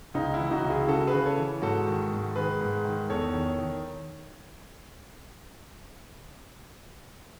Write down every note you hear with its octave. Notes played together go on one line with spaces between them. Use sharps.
C#2 D#4
E4
E3
D#4 F#4
C#2
E4 G#4
C#3 F#4 A4
G#4 B4
C#3
A4 C#5
E3
G#2 F#4 A4
D#3
G#2
D#3 G#4 B4
G#2
D#3
E2 A4 C#5
D#3
D#3